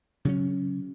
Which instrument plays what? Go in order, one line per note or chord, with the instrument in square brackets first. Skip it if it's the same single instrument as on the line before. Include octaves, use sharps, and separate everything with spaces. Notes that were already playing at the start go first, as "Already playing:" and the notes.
[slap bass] C#3 F#3 C#4